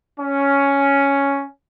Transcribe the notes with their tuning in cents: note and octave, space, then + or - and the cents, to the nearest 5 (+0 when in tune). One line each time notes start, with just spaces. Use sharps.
C#4 +5